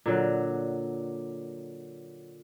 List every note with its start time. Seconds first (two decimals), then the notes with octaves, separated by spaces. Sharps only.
0.06 A#2 D3 F#3